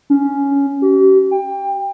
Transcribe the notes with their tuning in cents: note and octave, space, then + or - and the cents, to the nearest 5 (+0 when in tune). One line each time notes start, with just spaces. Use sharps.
C#4 +10
G4 -45
G5 +25